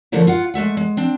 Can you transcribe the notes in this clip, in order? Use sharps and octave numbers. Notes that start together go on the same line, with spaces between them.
D3 E3 F3 A3 A#3 C#4
F4 F5 F#5
G#3 A3 E5 F#5
G#3
C4 D4